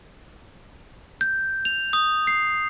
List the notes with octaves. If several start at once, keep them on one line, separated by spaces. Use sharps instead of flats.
G6
F7
D#6
C7